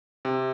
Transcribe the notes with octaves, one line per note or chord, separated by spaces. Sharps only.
C3